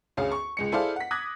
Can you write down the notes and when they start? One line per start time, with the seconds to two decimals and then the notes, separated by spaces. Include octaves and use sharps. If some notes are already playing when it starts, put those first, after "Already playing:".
0.17 D2 C#4 G#4 F5
0.32 C#6
0.57 C#2 G#3 C#7
0.72 E4 G#4 A4 C5 D5 F5
0.96 F#5 B6
1.11 D6 D#6 F#6 G#6 A#6